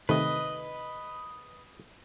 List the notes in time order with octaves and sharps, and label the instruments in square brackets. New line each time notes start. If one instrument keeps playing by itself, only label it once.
[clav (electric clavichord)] C3 D#3 A3 [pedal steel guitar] B4 D#5